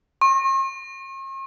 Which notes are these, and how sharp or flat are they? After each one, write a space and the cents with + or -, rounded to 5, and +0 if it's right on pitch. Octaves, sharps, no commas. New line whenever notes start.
C#6 -45